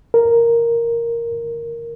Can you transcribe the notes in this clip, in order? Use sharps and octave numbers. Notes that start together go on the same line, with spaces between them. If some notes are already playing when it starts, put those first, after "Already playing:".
A#4